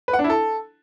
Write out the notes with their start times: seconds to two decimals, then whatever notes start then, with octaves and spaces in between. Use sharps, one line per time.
0.08 B4
0.13 F#5
0.19 D4
0.24 E4
0.30 A4